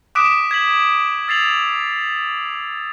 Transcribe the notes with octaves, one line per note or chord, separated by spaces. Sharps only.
D6 D#6 F#6 B6 D7 E7
G#6 B6 F#7
E6 A6 C7 F7 F#7